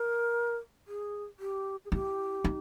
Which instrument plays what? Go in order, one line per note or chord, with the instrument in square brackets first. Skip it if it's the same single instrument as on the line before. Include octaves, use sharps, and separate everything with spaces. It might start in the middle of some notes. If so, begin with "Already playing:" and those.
Already playing: [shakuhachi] A#4
G#4
G4
G#4
[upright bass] E4 [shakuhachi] G4
[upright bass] D#4